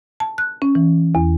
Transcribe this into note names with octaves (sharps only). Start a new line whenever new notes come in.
A5
F#6
C#4
E3
E2